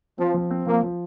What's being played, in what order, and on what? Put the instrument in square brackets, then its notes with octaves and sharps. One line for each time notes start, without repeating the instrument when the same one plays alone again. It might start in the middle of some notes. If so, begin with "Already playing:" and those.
[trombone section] F3 [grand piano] C4
[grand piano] F3
C4
[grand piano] F3 [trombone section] A#3
[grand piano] F3